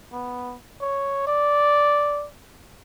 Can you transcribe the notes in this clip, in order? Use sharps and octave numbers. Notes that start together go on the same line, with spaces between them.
B3
C#5
D5